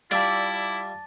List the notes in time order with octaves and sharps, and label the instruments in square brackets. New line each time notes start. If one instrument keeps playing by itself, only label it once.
[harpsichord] G3 F4 E5 [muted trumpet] E4 [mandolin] D5 [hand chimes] A5 D6 A6